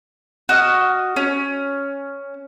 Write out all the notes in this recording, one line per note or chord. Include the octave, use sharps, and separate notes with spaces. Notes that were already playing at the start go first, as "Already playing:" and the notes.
F#4 D#5 F6
C#4